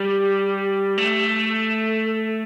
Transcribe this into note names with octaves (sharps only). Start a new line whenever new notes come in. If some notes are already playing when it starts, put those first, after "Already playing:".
Already playing: G3 G4
A3
A4